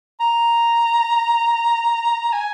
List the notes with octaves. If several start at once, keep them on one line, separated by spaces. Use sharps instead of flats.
A#5
G#5